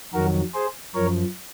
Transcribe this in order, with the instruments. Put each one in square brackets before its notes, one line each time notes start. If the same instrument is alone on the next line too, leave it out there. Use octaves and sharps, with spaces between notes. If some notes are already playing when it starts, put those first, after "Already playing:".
[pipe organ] F2 D#3 F#3 F#4 A#4
G#4 C5
F#2 F3 A#4 C#5